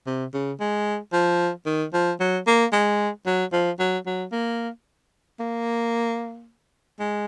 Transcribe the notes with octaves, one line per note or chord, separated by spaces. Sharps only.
C3
C#3
G#3
F3
D#3
F3
F#3
A#3
G#3
F#3
F3
F#3
F#3
A#3
A#3
G#3